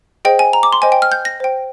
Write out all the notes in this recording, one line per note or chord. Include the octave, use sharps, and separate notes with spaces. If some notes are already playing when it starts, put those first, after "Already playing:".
G#4 C5 D#5 G5
G#5
A#5
D6
C6
C5 D#5 G5 G#5
G5
F6
G6
A#6
C5 G5